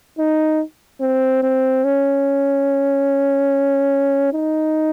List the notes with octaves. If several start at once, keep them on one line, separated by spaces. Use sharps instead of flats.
D#4
C4
C4
C#4
D#4